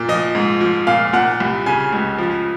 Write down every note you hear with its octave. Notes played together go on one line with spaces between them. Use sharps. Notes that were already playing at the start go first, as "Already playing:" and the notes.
Already playing: A#2
F3 D#5
G#2
F3
A#2 F5
A#2 F#5
C2
C#3 G#5
C#2
F3